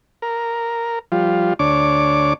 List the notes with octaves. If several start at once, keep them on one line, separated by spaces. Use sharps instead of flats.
A#4
F3 G3 F4
D2 D4 C#5 D6